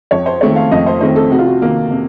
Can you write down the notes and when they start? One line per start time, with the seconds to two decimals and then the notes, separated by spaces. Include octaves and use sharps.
0.11 F2 C#5
0.26 C5
0.41 D#3 A3 C4 C#5
0.56 F5
0.71 F2 D#5
0.86 C5
1.01 D#3 A3 C4 C5
1.16 A4
1.31 C3 F#4
1.39 F4
1.47 F#4
1.62 D#3 A#3
1.91 C3